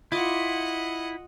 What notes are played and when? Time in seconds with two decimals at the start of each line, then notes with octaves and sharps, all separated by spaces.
0.12 E4 F4 D#5 F#5 D6